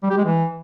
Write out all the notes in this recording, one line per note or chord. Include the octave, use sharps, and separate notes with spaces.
G3
G4
G#3
E3